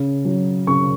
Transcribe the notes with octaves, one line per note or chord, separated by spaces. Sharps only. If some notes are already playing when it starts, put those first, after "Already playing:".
Already playing: C#3
F#3
C#3 C#6